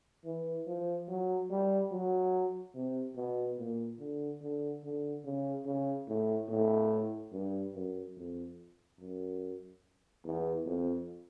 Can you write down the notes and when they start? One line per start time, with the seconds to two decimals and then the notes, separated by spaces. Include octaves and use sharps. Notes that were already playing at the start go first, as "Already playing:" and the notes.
0.25 E3
0.67 F3
1.08 F#3
1.50 G3
1.91 F#3
2.75 C3
3.16 B2
3.58 A#2
4.00 D3
4.41 D3
4.83 D3
5.25 C#3
5.66 C#3
6.07 A2
6.49 A2
7.33 G2
7.75 F#2
8.17 F2
8.99 F#2
10.24 E2
10.66 F2